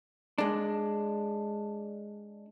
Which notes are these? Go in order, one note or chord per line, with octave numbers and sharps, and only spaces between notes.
G#3 D4